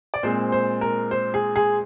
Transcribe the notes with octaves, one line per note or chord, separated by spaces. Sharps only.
D5
A#2 G#3 C4 C5
C5
A#4
C5
G#4
G#4